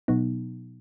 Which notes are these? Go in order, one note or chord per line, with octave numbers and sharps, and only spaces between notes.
B2 F#3 B3 D#4